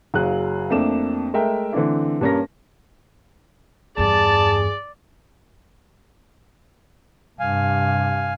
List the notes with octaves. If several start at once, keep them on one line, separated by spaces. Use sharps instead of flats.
F#1 F#3 G#4 F5 F#6
F2 A3 A#3 D4 E7
G#3 A3 A#4 E5 G5
D3 E3 A3 C4 D4 E4
G2 A#3 C#4 A#4 A#6
E2 G2 G#4 D5 A5
G2 C3 F5 G#5